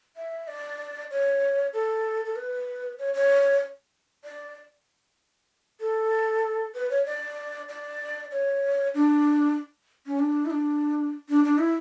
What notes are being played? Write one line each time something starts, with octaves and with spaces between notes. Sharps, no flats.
E5
D5
C#5
A4
A4
B4
C#5
C#5
D5
A4
B4
C#5
D5
D5
C#5
D4
C#4
D4
E4
D4
D4
D4
E4